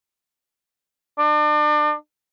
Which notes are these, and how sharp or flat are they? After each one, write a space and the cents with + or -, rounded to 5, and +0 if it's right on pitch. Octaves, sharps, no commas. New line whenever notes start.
D4 +35